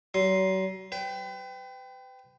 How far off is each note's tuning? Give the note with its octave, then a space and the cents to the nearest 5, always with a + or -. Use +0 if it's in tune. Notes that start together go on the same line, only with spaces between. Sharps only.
F#3 +40 C6 +0
B4 +40 G5 -5